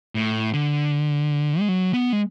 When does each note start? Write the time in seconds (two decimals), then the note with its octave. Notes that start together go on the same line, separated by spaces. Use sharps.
0.15 A2
0.54 D3
1.60 G#3
1.69 F#3
1.94 B3
2.13 G#3